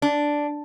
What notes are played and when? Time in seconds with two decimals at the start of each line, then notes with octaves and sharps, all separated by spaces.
0.02 D4